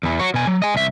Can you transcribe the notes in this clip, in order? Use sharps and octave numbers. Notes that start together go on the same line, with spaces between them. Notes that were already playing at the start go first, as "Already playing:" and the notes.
E2 E3
F#4 C#5
B2 G#5
F#3
D#5 G#5
C2 E5